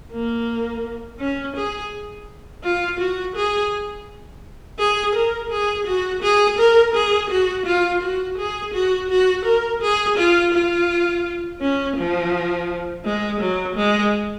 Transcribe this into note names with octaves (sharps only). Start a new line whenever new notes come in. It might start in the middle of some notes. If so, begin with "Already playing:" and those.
A#3
C#4
G#4
F4
F#4
G#4
G#4
A#4
G#4
F#4
G#4
A#4
G#4
F#4
F4
F#4
G#4
F#4
F#4
A#4
G#4
F4
F4
C#4
F3
G#3
F#3
G#3